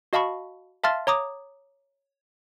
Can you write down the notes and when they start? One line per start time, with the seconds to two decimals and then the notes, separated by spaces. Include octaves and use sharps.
0.13 F#4 D#5 F5 A5 B5 C#6
0.84 E5 F5 A5 C6 F6 A6
1.07 C#5 A#5 D6 D#6